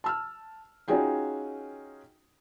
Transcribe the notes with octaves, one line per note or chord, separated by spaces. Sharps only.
A5 E6 F6
C#4 D#4 F4 F#4 G#4 G5